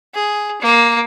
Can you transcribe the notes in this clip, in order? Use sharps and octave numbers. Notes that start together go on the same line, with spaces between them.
G#4
A#3